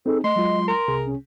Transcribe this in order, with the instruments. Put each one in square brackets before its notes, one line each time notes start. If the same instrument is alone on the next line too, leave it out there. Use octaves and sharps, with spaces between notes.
[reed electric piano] C4 D#4 G#4 [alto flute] A4
[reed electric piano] A3 [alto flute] D#5 [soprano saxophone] C6
[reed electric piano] F#3 G#3 F4
[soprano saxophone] A#4 [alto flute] C6
[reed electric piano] C2 C3 G#4
[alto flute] C#4